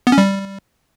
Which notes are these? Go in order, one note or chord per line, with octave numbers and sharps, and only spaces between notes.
B3
C#4
G3